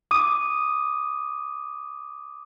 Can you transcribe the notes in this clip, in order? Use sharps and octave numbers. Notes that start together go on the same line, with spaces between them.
D6 D#6 D#7